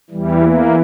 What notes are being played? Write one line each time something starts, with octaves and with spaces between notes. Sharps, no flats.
E2 E3 G3
A#3